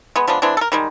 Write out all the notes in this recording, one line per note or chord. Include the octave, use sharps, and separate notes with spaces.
G#3 B3
F3 G#3 B3 D4
E3 G#3 C4 D4
A4 A#4
D#3 G3 G#3